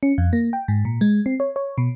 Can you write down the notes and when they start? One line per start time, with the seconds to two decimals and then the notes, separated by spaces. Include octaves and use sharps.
0.03 C#4
0.18 F2
0.33 A#3
0.53 G5
0.68 G#2
0.85 A#2
1.01 G#3
1.26 C4
1.40 C#5
1.56 C#5
1.78 B2